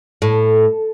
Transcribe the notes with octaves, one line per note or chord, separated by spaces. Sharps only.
A2